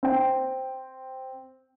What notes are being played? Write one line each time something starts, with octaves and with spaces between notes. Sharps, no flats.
C4 G5